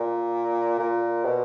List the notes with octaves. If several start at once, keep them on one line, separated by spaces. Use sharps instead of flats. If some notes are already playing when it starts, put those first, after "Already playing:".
Already playing: A#2
A#2
B2